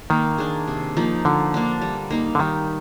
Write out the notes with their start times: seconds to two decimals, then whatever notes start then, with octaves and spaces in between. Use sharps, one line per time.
0.10 D#3 A#3
0.38 D4 G#4
0.67 C3
0.97 F3 A#3 D#4
1.25 D3 F3
1.54 A#3 D4
1.81 G3
2.10 A#3 D#4
2.35 D3
2.39 D#3 G3